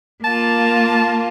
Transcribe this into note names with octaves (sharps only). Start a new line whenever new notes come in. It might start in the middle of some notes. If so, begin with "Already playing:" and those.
A#3 F4 A5